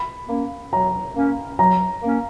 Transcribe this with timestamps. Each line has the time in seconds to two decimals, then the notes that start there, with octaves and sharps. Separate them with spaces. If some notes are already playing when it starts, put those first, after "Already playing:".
Already playing: B5
0.28 A#3 C#4
0.72 F#3 A#5
1.15 A#3 C#4
1.59 F#3 A#5
2.03 A#3 C#4